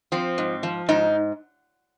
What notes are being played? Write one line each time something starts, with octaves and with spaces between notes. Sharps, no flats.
F3 C4
G#2
F3
G#2 D#4